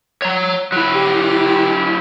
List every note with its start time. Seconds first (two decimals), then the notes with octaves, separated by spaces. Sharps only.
0.22 C#5 A#5
0.72 F#3 E4
0.95 G4